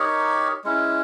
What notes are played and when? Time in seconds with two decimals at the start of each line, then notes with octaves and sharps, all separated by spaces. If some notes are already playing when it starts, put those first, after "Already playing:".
Already playing: D#4 G4 A#4 C#5
0.64 G#3 C#4 E4